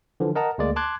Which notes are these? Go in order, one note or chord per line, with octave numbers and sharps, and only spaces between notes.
D3 E3 F3
A#4 D#5 F#5 A5 A#5
D2 G#3 A#3 D5
A5 C6 D6 F#6 G#6